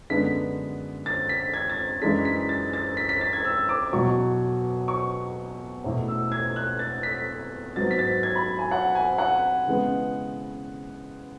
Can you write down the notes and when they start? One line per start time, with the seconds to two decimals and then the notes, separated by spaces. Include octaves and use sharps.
0.10 F#2 D3 G#3 B3 D4 B6
1.06 A6
1.29 B6
1.54 G#6
1.70 A6
2.01 F#2 E3 G#3 D4 B6
2.25 B6
2.49 A6
2.73 A6
2.97 B6
3.09 B6
3.21 A6
3.33 G#6
3.45 E6
3.69 D6
3.93 E2 B2 F#3 C#6
4.88 C#6
5.84 E2 B2 A3 E4
6.08 E6
6.32 G#6
6.56 F#6
6.79 A6
7.03 B6
7.76 G#2 F#3 B3 A6
7.91 B6
7.99 A6
8.23 G#6
8.35 B5
8.59 G#5
8.71 F#5
8.95 G#5
9.18 F#5
9.67 C#3 E3 G#3 B3